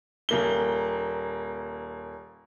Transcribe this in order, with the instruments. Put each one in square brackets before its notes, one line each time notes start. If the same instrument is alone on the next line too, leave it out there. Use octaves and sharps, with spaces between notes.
[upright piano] D#1 A#3 G7